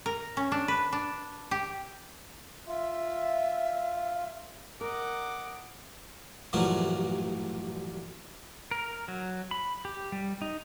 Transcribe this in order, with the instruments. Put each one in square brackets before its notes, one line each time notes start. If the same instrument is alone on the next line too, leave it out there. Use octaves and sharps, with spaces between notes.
[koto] A#4
C#4
D4
B4
D4
G4
[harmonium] F4 [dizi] E5
[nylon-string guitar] A#4 [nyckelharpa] D#5 F#5 [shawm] D6
[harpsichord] A1 G2 A#2 F3 F#3
[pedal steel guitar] A#4
F#3
B5
G4
G3
D#4